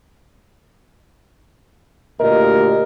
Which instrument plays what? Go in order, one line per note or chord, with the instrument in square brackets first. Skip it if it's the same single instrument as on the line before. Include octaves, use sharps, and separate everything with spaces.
[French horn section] D2 A#2 G4 A#4 D#5